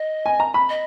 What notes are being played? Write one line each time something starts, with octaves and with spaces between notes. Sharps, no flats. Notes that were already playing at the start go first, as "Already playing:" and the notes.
Already playing: D#5
G#5
A#5
B5
D#5